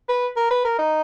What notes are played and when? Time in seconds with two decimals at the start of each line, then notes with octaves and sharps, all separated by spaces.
0.09 B4
0.36 A#4
0.51 B4
0.65 A#4
0.78 D#4